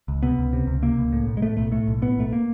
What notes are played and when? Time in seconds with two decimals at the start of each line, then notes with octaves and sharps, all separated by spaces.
0.08 C#2
0.23 C3 B3
0.38 C#2
0.53 C3
0.67 C#2
0.82 C3 A#3
0.98 C#2
1.12 A2
1.27 B1
1.37 G#3
1.42 A2 A3
1.57 B1 A3
1.72 A2 A3
1.87 B1
2.02 A2 B3
2.18 B1 A3
2.33 A#3